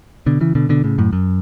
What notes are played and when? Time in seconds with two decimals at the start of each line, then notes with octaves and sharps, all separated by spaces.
0.26 B2 D3
0.41 C#3 E3
0.55 B2 D3
0.69 B2 D3
0.84 A2 C#3
0.98 F#2 A2
1.13 F#2